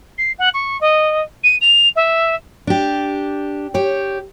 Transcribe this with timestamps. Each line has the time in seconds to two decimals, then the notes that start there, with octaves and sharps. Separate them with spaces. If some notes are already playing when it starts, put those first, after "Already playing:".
0.18 C7
0.38 F#5
0.53 C#6
0.80 D#5
1.43 D#7
1.61 F7
1.96 E5
2.67 D4 G4
3.74 G4 C#5